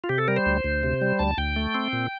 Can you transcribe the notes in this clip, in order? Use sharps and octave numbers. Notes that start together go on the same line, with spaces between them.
F4
C3 G4
A4
G3 A#4
C5
D2
D2
C3
G3
D2 A5
D2 G5
A3
C4
A#2